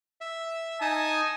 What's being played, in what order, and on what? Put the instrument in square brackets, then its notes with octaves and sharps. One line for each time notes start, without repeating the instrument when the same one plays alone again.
[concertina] E5
[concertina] D#4 A5 D#6 [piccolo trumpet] G#5